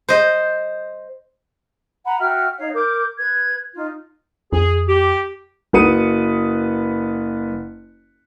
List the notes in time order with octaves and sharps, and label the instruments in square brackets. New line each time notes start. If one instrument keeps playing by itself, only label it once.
[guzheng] C5 D#5
[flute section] F#5 A#5 B5
F#4 E5 G5 F6
D#4 C#5 F5
A#4 D6 G6
B4 G#6
D#4 F4
[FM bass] F2 [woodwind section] G#4
[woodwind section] G4
[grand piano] F#1 F#4 B4 D#6 C#7 D#7